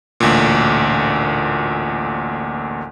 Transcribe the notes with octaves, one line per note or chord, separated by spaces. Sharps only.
A1 D2 A#2